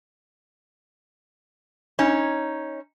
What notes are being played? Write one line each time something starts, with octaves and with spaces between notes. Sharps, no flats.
C#4 D#4